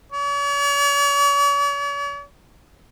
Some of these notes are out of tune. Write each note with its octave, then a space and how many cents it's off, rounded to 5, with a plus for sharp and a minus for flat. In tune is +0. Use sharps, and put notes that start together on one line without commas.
C#5 +45